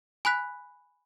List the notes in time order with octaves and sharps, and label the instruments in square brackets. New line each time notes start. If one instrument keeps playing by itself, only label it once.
[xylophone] G#5 B5 F#6 B6